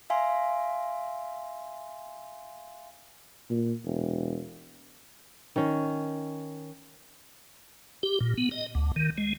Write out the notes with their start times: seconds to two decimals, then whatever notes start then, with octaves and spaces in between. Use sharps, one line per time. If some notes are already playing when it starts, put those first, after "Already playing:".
0.10 E5 F5 G#5 C6
3.50 A#2
3.85 E1
5.56 D#3 C#4
8.03 G4
8.21 A#2
8.38 B3
8.51 D#5
8.75 D2
8.96 D#3
9.18 G#3